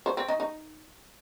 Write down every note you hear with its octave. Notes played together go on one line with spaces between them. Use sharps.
C5
C4
D#4
D#4